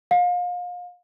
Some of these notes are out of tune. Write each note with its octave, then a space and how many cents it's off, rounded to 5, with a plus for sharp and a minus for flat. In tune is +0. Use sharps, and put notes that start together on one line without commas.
F5 +35